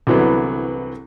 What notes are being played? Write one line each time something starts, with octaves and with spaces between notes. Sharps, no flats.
C2 D3 E3 F#3 B3